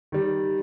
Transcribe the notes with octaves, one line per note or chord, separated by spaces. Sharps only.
D#3 G3